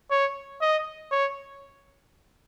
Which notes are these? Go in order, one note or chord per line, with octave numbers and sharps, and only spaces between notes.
C#5
D#5
C#5